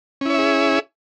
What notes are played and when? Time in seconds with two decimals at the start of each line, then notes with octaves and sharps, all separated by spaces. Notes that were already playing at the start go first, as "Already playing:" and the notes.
0.21 C#4
0.26 E4
0.30 C#5
0.34 E5
0.39 G#4